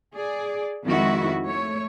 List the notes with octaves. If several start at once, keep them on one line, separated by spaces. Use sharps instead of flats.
G#4 D5
F2 D#3 G#3 E4 F#4
A3 C#5